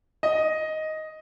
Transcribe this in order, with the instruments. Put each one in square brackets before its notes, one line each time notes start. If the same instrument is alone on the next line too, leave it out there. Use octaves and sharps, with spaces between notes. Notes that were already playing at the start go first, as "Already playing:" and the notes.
[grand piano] D#5